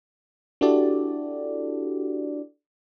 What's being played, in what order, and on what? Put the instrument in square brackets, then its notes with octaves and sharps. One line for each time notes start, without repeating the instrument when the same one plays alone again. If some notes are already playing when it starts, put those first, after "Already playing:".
[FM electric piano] D4 E4 F#4 G4 A4 D5